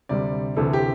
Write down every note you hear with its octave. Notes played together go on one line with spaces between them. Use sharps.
D2 C3 G3 D5
D2 C3 E3 A4
G4